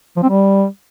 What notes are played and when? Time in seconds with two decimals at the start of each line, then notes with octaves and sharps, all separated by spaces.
0.17 F3
0.23 C4
0.29 G3